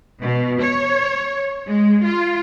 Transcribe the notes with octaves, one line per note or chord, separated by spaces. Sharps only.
B2
C#5
G#3
F4